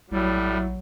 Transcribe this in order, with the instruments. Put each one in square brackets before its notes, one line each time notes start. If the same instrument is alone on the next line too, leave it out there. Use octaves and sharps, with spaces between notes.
[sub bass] A#1 [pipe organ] A2 G3 [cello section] F#3 [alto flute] E4